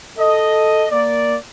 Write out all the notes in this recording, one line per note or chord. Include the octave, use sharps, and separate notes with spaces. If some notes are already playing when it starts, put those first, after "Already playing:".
A4 D#5
A#3 D5